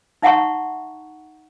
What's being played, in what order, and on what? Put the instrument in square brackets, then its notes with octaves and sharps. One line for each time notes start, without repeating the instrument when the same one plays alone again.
[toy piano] D#4 E5 F#5 A#5 C6 C#6